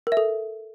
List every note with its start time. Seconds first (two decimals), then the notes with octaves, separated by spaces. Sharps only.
0.07 A#4
0.12 E5
0.17 A4